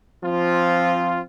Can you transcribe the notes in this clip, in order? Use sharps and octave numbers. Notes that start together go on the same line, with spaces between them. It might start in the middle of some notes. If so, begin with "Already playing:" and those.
F3 C4 F4